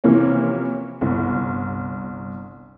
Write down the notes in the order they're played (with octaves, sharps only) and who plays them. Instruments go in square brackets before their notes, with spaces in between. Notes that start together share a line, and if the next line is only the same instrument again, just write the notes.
[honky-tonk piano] C3 E3 F3 A#3 C#4
G1 C2